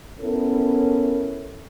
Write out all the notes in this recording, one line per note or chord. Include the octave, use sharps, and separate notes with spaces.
B3 C#4 E4 A4 A#4